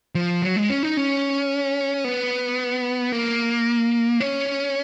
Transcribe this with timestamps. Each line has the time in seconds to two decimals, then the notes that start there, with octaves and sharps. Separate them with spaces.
0.15 F3
0.42 F#3
0.56 G#3
0.70 C#4
0.83 D#4
0.97 C#4
2.04 B3
3.12 A#3
4.20 C#4